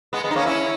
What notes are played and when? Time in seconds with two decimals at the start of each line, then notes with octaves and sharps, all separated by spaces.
0.13 G#3 B3
0.24 G#3 B3
0.31 D#4
0.35 A#3 C#4
0.46 C#4 E4